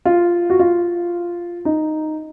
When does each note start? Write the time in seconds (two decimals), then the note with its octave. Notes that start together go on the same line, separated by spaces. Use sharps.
0.05 F4
0.50 F#4
0.59 F4
1.65 D#4